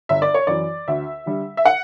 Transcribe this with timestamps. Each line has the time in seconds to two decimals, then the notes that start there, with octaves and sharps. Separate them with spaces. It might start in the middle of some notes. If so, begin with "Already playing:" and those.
0.09 G1 E5
0.22 D5
0.34 C#5
0.47 F#2 E3 D5
0.88 D2 E5
1.26 D3 G3
1.57 E5
1.65 F#5